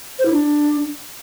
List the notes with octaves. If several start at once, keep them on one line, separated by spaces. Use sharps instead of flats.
C5
E4
D4